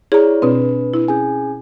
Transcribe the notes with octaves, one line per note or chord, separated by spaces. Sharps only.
E4 G#4 C#5 D5 A#5
B2 C4 D4 B4
E4
C#4 G#4 G#5